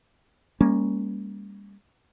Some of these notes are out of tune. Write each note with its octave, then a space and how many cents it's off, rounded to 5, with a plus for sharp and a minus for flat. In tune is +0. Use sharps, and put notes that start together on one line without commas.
G3 +40 A#3 +0 C#4 +0